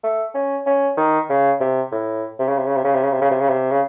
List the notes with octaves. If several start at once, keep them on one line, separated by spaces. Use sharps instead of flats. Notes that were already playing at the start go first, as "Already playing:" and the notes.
A3
C#4
C#4
D#3
C#3
C3
A2
C3
C#3
C3
C#3
C3
C#3
C3
C#3
C3
C#3
C3
C#3
C3
C#3